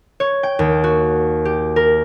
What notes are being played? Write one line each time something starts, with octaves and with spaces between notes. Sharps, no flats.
C#5
G5
D#2
F#4
G4
A#4